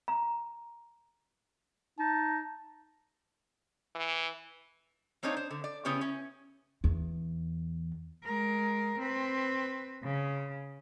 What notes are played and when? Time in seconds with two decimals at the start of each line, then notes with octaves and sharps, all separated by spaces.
0.08 A#5
1.99 D#4 A5
3.95 E3
5.23 A#3 C4 D4 D#4 C#5
5.37 C5
5.51 D3
5.64 D5
5.85 C#3 B3 C#4 E4 G4
6.01 C#4
6.84 E2
8.25 G#3 A#4
8.99 C4 B4
10.03 C#3